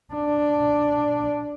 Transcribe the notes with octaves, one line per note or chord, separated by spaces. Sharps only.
D4